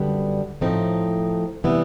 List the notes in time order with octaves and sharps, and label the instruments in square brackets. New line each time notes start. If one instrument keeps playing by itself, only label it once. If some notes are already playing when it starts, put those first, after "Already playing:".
Already playing: [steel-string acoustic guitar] F#2 D3 G3 B3 D4
A2 F3 A3 C4 D#4
C3 E3 G3 B3 E4